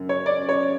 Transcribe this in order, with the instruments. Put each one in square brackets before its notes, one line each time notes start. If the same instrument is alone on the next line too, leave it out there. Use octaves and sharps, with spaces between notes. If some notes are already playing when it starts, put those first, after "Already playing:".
Already playing: [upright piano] F#2 C#3
C#5
D5
C#5